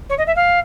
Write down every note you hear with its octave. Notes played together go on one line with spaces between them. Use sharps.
C#5
D#5
E5
F5